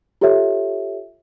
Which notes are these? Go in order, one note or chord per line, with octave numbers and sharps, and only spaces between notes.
F4 G4 A4 C#5 E5